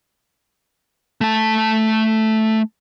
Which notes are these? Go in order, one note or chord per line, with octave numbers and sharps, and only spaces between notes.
A3 A5